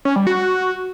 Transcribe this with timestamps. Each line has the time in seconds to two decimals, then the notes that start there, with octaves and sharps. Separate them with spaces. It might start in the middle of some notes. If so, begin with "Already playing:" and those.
0.05 C#4
0.16 G3
0.27 F#4